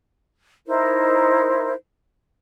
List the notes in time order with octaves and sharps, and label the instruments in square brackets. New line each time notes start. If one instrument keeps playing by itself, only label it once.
[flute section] D#4 E4 A#4 C5